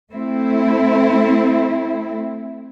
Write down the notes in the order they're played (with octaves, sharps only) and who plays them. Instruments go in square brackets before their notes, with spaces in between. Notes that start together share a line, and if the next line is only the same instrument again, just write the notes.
[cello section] A3 C4 E4